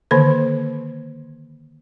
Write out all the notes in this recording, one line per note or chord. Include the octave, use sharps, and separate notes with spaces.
D3 D#3 A#3 A4 C5